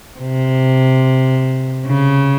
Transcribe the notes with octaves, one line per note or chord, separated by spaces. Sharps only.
C3
C#3